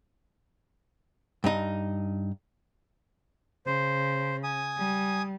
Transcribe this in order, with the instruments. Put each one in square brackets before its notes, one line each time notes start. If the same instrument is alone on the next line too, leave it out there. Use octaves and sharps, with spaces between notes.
[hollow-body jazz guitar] G2 D#4
[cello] C#3 [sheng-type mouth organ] C5
[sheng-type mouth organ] G#5 D#6
[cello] G3